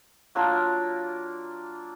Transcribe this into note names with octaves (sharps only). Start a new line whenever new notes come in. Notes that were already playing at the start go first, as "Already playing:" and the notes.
F#3 A#3 D4 F4